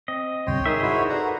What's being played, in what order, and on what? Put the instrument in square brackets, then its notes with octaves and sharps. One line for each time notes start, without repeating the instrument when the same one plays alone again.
[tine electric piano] C4 [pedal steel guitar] D#5
[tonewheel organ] D2 G2 C3 [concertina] C#5 G5 C6
[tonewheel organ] D#4 [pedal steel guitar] G#4 C5 E5 [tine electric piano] A#4 D#6
[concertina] E4 F#4 C#5
[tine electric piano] A4 B4 D5 [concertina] F#5 A#5